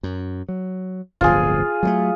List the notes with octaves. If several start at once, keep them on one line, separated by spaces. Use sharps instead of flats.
F#2
F#3
D1 G1 F3 F4 G#4
F#3 G#3 A3